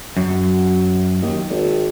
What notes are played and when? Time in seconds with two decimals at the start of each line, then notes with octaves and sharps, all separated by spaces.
0.17 F#2 F#3
1.22 D#2
1.50 G#1